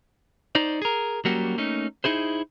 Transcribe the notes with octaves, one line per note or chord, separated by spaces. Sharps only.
D#4 C5 D5
G#4 A#4
F#3 G3 A#3 C#4 F#4 G4
A3 A#3 C#4 D#4
D#4 E4 G#4 C5